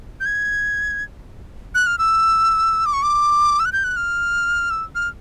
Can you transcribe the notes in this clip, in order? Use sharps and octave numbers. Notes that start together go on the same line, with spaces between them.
G6
G#6
F#6
F6
E6
D6
C#6
D6
E6
F#6
G6
F#6
F6
E6
F6